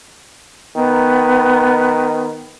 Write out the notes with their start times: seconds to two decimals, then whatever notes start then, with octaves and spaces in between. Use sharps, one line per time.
0.76 D#3 B3